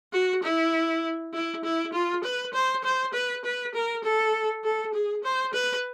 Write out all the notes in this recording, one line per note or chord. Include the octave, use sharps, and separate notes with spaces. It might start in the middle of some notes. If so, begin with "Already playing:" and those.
F#4
E4
E4
E4
F4
B4
C5
C5
B4
B4
A#4
A4
A4
G#4
C5
B4